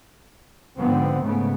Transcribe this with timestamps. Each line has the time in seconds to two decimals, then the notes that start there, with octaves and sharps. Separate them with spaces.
0.77 G#2 D3 F3 B3 C4
1.22 G#2 C#3 A3 B3